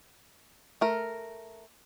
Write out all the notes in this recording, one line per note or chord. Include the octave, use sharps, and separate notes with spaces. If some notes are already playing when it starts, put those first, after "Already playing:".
A3 A#4